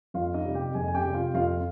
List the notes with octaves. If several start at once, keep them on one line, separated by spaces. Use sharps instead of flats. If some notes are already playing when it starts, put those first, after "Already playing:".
F2 F4 F5
D#4 D#5
C3 G3
G4 G5
F2 G#4 G#5
G#5
G4 G5
C3 G3
F4 F5
F2 F4 F5